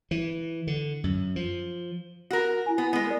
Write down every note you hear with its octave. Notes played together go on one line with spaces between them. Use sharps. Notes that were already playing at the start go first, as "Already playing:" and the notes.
E3
D3
F#2
F3
F#4 A#4
E4 G#5
B3
G#3 B3
A#4 D5